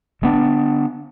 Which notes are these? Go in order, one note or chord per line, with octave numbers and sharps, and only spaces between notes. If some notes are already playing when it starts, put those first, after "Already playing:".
D3 G#3 B3 D4